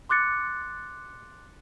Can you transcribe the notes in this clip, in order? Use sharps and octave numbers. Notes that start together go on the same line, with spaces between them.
C6 D6 F#6 A6 C#7